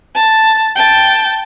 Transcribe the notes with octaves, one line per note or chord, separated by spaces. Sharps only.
A5
G5 A5